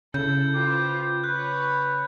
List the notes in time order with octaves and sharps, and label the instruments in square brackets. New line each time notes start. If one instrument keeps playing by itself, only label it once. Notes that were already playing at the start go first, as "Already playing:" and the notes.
[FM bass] C#3 [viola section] E4 A4 [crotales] G6
[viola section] F4 C5 [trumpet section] B4 G5 D6
[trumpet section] B4 [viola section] C#5 [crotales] F#6